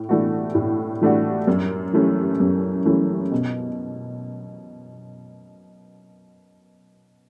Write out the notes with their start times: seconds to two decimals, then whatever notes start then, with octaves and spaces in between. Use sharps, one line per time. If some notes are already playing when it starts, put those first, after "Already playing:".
Already playing: A2
0.09 E3 A3 D4 F#4
0.55 A2
1.01 E3 A3 D4 F#4
1.47 F#2
1.93 E3 A3 C#4
2.40 F#2
2.85 E3 A3 C#4
3.32 B2